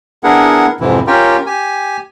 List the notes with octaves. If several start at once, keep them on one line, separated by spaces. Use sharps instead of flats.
B3 D4 E4 G#4 A#4 F#5
F2 G#2 C3 E3 E4
C#4 F4 G4 A#4 G5
G4 G#5